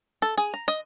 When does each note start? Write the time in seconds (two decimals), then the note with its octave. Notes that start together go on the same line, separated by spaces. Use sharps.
0.22 A4
0.37 G#4
0.54 A#5
0.68 D#5